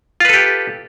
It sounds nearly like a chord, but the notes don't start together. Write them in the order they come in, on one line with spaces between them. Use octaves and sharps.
F4 B4 A4 G4